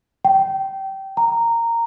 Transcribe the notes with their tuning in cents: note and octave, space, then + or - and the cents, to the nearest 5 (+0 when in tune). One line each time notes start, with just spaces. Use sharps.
G5 -20
A#5 -10